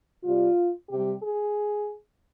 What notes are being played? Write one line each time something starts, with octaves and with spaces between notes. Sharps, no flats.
C3 G3 F4
C3 G3 G4
G#4